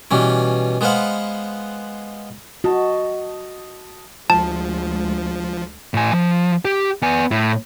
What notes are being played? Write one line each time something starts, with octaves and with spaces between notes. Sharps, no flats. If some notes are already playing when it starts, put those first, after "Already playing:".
B2 E3 G3 C#4
G#3 B3 B4 C5 F5 F#5
F#4 D#5 A5
D2 F3 G#3 A5
A2 G#5
F3
G4
B3 G#5
A2